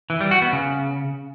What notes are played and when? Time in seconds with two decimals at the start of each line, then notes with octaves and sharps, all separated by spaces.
0.10 E3
0.21 G3
0.31 F#4
0.42 B3
0.53 C#3